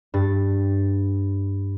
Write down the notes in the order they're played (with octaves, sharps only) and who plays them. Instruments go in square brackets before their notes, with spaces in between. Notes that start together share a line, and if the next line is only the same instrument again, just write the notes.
[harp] G2 A6